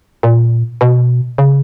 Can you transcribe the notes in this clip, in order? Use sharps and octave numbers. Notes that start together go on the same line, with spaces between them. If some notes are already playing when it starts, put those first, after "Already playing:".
A#2
B2
C#3